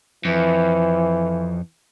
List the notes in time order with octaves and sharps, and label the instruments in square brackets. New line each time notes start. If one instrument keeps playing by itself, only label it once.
[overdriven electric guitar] F2 [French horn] E3